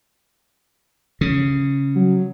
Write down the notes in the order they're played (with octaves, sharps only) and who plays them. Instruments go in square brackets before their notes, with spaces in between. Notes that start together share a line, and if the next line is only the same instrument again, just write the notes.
[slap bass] C#3
[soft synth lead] F#3